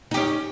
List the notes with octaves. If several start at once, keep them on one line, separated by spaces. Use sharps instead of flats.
C#4 D#4 G4